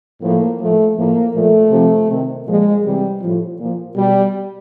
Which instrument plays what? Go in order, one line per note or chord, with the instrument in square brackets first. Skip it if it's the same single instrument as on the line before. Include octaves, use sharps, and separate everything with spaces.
[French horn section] A2 F3 A#3
A2 F3 A3
A2 F3 A#3
A#2 F3 A3
C3 F3
C3 D#3
A#2 F3 G#3
C3 E3 G3
A2 F3
A#2 F3
B2 G3